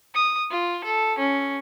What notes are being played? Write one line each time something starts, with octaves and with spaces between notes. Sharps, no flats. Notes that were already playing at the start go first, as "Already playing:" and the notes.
D#6
F4
A4
C#4